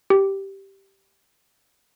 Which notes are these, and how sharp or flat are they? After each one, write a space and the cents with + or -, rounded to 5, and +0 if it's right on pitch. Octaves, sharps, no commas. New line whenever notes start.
G4 -5